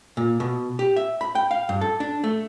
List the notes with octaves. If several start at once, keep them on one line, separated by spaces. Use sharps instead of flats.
A#2
B2
G4
E5
B5
G5
F5
G2
A4
D4
A3